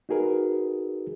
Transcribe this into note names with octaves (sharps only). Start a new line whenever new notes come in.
D#4 F#4 G#4 A#4 B4